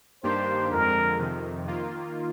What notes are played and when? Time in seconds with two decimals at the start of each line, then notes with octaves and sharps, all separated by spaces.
0.23 G2 D#3 A#3 D4 G4 C5
0.71 F2 D3 G#3 A#4
1.19 F2 C3 D#3
1.67 D#3 A#3 F4